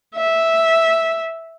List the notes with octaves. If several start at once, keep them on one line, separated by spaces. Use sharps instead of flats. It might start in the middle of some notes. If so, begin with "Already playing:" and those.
E5